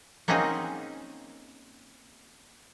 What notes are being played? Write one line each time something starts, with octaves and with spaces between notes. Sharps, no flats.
A#3 C4 C#4 D#4 F#4 G#4